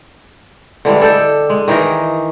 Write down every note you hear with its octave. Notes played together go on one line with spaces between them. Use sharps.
D3 E3 G3 G#3
D4 A4 G5
G#3
D#3 E3 D#4 A#4